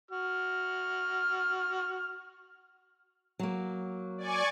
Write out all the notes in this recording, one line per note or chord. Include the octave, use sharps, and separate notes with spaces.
F#4 F6
F#3 A#3
D5 G#5 C#6